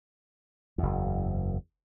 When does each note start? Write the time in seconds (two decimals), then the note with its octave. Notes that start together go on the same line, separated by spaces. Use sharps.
0.78 F#1 E2